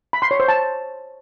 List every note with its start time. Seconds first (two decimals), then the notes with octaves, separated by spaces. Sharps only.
0.13 B5
0.22 C6
0.31 C#5
0.40 C5
0.48 A5